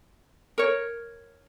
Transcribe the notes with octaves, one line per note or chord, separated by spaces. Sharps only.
A#4 C#5